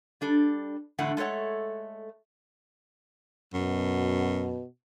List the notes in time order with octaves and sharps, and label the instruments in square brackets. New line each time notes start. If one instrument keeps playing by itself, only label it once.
[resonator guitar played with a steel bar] G3 D4 A4
E2 A2 D3 A3 F#5
G#3 A3 A4 C#5 F#5
[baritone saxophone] F#2 [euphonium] B2